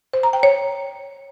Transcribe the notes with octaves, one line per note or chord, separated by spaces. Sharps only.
C5
A#5
G5
C#5